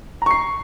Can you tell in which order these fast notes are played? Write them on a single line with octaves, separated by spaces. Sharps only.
A#5 C#6 C7